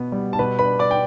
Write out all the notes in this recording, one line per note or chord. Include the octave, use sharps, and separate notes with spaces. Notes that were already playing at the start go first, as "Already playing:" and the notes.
Already playing: B2 B3
G3
A5
B2 B4 B5
B4 B5
D4
D5 D6
G5